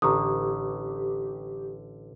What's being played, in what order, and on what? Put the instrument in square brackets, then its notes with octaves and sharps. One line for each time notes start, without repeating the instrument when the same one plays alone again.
[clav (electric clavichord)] A1 D3 [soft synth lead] G4 [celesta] A#5 C#6 D#6